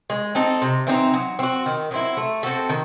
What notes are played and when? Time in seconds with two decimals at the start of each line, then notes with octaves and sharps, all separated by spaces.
0.10 G#3
0.35 C4 D#4 A4
0.62 C3
0.87 E3 C4 D#4
1.14 F#3
1.39 C4 F#4
1.66 D#3
1.91 F#3 C4 E4
2.17 A3
2.43 C4 F#4 A4
2.69 D#3